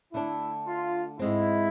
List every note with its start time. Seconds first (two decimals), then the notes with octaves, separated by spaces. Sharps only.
0.13 D3 A3 D4 E4
0.67 F4
1.19 G#2 G#3 C4 E4